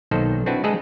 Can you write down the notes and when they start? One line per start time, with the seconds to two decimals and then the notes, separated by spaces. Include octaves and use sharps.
0.11 B1 D#3 A#3 A4 C5
0.46 C4 D4 E4 F#4 B4
0.64 G#3 A3 G#4 A4 B4 D#5